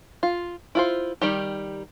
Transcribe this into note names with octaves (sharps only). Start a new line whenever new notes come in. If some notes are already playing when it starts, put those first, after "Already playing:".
F4
E4 F4 C5
D#3 G3 G4